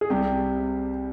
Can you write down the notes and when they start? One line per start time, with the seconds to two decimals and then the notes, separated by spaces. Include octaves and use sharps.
0.01 G#4
0.10 C2 C3 G3 G4